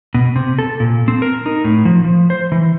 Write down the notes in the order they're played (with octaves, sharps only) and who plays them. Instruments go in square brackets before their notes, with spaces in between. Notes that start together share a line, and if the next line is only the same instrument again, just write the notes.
[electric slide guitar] B2
C3
A4
A#2
C4
A#4
D#4
A2
F3
F3
C5
E3